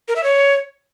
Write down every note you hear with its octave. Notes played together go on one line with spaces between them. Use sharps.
A#4
E5
C#5